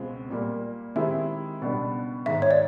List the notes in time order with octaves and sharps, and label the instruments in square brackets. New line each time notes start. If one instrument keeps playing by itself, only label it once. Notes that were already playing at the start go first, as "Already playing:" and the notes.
Already playing: [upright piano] C#2 B2 G#3 C4 F4
A#2 G3 A#3
[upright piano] D#3 G#3 C4 E4 G4 [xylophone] E5
[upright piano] C#2 B2 G3 B3 D4
[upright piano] G#2 D#3 G#3 [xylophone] E5
[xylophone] C#5
D5